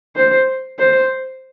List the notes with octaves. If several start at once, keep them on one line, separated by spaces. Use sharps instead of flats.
C5
C5